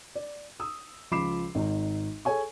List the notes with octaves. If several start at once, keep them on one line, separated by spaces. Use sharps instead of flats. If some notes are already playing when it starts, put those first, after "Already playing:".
D5
D#6 E6
C#2 F3 B5 D6 C7 E7
G#1 D#4
G#4 A4 C#5 G#5 C#6